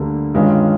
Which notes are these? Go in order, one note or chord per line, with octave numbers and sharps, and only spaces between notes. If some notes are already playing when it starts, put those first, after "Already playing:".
Already playing: D2 D3 G3 A#3
G2 D#3 G#3 C#4 F4